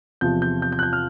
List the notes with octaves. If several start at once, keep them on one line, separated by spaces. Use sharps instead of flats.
E2 C3 F3 G6
G6
G6
G6
F#6
G6
F6